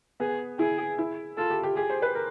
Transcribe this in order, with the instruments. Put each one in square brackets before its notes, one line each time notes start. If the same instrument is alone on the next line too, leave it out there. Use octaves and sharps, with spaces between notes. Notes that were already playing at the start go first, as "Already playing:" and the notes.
[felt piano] B3 [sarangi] G#4
[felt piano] E4 [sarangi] G#4
[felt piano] E4
[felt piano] F4 [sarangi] A4
[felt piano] G4
G4
[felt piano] G4 [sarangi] G#4
[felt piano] C5
B4
A#4